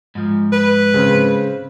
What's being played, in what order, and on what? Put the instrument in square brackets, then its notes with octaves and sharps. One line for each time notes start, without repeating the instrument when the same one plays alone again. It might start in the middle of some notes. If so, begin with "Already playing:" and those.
[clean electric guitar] G#2 F3
[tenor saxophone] B4
[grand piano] C#3 C4